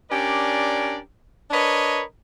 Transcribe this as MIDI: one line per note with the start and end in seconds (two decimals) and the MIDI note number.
0.10 0.99 61
0.10 0.99 62
0.10 0.99 67
0.10 0.99 70
0.10 0.99 74
1.51 2.03 62
1.51 2.03 70
1.51 2.03 71
1.51 2.03 73
1.51 2.03 75